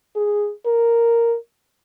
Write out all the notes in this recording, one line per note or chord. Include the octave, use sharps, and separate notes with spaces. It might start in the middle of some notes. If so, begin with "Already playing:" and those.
G#4
A#4